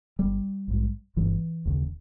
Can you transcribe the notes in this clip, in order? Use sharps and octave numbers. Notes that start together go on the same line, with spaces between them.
G1 G2 G3
A#1 G#2
G1 G2 E3
E1 D#2 C#3